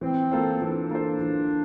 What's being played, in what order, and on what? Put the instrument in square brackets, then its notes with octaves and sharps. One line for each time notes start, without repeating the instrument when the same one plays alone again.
[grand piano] E3 [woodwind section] C4
[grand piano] A#3 F4 A4 C5
[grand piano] E3 [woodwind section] D4
[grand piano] A#3 F4 A4 C5
E3